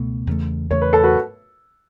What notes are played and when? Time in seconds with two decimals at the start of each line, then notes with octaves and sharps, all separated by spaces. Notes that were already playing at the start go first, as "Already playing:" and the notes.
Already playing: C#2 B2 A3
0.27 E2 C#3 A3
0.70 E2 C#3 A3 C#5
0.81 B4
0.93 A4
1.03 F#4 B4